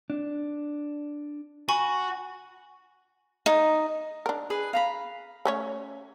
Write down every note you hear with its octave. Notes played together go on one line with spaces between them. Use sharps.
D4
F#4 G#5 B5 C#6
D#4
D4 A#4
G#4 B4
F5 A#5 B5
A3 C#4 C#5